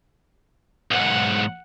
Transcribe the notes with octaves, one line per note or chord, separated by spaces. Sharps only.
B1 G#2 F#5